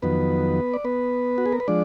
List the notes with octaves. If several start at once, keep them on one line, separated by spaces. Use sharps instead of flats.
F2 D#3 F#3 B3 B4
D5
B3 B4
F#4
G#4
A#4
B4
F3 G#3 D4 D5